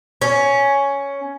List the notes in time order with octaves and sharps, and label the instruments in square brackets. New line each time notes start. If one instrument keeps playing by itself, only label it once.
[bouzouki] C#4